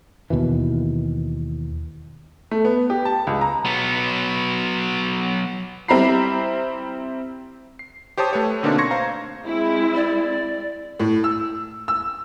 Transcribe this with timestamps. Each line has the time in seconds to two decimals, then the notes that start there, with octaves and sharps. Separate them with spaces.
0.30 D#2 B2 D#3 E3
2.51 A3
2.65 B3
2.90 G4
3.05 A5
3.27 C#2
3.41 A#5
3.65 F#3 B3
5.88 G3 C4 E4 A#5 B5 C7
7.79 C7
8.18 G4 C5 C#5 A5 D#6
8.33 A3 B4 C#5
8.63 B2 D3 A#3 C4 D4 D#4
8.78 C6 C#6 G#6 A#6 C#7
8.91 C5 F5 A#5
9.45 G#3 C4 E4
9.95 D5
11.00 A2
11.24 E6
11.88 E6